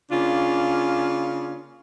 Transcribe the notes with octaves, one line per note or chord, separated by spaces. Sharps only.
C#3 A#3 C#4 D4 F4